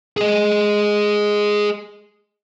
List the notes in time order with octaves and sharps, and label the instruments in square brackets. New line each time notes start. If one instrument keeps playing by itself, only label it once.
[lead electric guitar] G#4 D#5